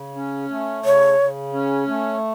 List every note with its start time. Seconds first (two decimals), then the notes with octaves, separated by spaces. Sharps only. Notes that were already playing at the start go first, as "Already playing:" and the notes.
Already playing: C#3
0.15 C#4
0.50 A3
0.84 C#3 C#5
1.19 C#3
1.53 C#4
1.87 A3